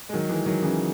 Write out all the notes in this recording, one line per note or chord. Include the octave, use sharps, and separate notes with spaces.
G#3
D#3 F#3
E3 G#3
D#3 F#3
C#3 E3